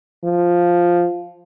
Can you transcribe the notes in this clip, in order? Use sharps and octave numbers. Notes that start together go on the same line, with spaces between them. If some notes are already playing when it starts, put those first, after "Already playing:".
F3